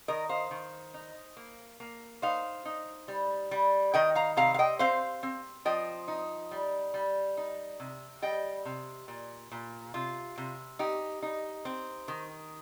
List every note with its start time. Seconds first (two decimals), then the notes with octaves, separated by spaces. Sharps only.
0.08 D#3 A#4 D#5
0.29 C5 F5
0.51 D#3
0.94 D#4
1.37 A#3
1.80 A#3
2.22 D#4 C5 F5
2.65 D#4
3.08 G3
3.51 G3
3.94 D#3 D#5 G5
4.15 F5 A#5
4.37 C3 F5 A#5
4.54 F5
4.59 D#5 G5
4.79 C4 C5 F5
5.23 C4
5.65 F3 D#5 G5
6.08 D#4
6.51 G3
6.94 G3
7.37 D#4
7.80 C3
8.22 G3 D#5 G5
8.65 C3
9.08 A#2
9.52 A#2
9.94 C3 F4
10.38 C3
10.79 D#4 G4
11.22 D#4
11.65 C4
12.08 D#3